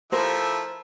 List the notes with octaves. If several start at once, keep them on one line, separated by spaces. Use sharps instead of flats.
F3 A3 E4 A#4 C5